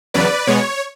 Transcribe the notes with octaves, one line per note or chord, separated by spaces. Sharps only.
E2 C#3 F#3 B4 D5
B2 G#3 B3 C#5